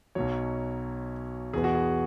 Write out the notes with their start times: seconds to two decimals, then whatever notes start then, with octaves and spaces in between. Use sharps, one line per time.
0.15 B1 B2 F#3 C#5
1.53 E2 B2 B3 G#4
1.64 F#4
1.75 G#4